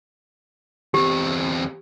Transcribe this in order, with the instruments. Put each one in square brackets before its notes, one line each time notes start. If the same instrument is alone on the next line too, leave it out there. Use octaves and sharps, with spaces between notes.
[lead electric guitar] E2 C4 [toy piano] G4